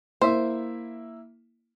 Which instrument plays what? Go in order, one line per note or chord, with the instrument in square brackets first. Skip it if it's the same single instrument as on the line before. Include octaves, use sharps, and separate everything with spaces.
[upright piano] A#3 E4 E5 [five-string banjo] C5